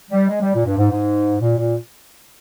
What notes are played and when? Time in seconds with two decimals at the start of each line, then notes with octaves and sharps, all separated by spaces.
0.11 G3
0.29 G#3
0.41 G3
0.54 A#2
0.66 G2
0.78 G#2
0.91 G#2
1.40 A#2
1.58 A#2